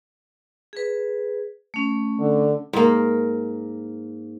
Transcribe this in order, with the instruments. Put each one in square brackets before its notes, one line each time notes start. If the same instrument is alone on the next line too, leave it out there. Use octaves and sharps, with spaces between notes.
[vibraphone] G#4 B4
A3 C#4
[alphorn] D3
[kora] G#2 A#3